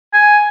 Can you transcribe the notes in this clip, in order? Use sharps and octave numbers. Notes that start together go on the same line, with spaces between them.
G#5